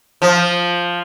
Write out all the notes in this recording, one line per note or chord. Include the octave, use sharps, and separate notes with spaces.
F3